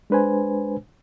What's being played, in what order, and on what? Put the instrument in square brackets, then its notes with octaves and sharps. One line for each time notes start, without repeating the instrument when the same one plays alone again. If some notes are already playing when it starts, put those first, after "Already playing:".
[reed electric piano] G#3 D4 B4 C5 G#5